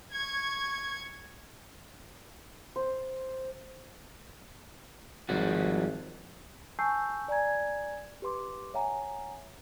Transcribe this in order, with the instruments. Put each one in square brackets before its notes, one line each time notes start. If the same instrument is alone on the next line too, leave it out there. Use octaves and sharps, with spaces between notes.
[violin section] C#6 G#6
[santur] C5
[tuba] G#1 [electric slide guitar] F3 G3 F#4
[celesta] G#5 A5 C#6 E6 G6 C7
D5 G#5 A#5 G#6
G4 B4 C6 D6
C#5 E5 F#5 G#5 A#5